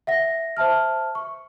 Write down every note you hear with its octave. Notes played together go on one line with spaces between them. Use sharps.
E5 F#5 A#6
C5 E5 A5 F6
C#6